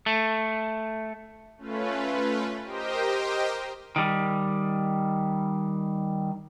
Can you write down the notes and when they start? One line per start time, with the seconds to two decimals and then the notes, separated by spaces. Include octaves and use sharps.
0.06 A3
1.57 A3 C#4 F4 B4
2.64 G4 A#4 C5 D#5 G5
3.96 D#3 G3